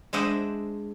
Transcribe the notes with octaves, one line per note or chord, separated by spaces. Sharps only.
G#3 D4 C5 D#5 E5 F#5